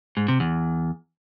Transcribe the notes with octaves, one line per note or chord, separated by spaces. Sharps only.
G#2
C3
E2